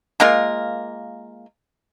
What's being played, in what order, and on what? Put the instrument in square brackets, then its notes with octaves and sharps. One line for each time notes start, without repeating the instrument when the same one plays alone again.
[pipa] G#3 A#3 F4 A#4